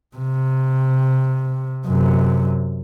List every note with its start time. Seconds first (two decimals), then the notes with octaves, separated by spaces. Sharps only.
0.16 C3
1.87 F#2 C3